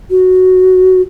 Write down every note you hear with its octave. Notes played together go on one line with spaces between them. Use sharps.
F#4